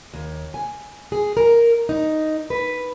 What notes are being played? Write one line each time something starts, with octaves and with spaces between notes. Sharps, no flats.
D#2
G#5
G#4
A#4
D#4
B4